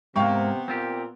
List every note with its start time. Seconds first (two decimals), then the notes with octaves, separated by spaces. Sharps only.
0.16 G#2 C3 A#3 B3 F5 G5 C#6
0.68 A#2 C4 F4 G4